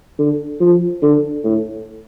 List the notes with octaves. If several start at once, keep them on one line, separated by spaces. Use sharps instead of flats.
D3
F3
D3
A2